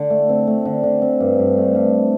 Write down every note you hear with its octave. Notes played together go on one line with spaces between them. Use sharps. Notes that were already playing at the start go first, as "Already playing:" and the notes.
Already playing: D3
A3
C4
A3
D3
D3
C4
G2
G2
A3
G2